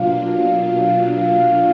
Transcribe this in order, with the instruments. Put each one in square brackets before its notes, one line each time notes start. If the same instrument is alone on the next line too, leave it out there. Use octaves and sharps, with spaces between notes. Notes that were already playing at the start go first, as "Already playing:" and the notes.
Already playing: [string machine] B2 F#3 A#3 D4 F4 [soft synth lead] F5
[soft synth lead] F5